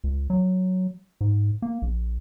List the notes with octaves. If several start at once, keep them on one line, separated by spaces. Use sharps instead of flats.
C#2
F#3
G#2
A#3
A#1